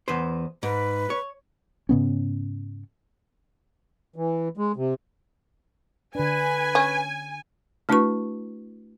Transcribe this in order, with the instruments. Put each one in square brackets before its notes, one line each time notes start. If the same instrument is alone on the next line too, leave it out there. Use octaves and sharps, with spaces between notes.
[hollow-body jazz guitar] E2 B4 C5
[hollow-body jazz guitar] G#2 [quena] B4
[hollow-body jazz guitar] C#5
[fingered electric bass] G#2 C#3 B3 C#4
[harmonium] E3
G#3
C3
[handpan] D3 D4 [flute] B4 [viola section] G#5
[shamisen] C#4
[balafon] A3 D4 E4 F#4 B4 C#6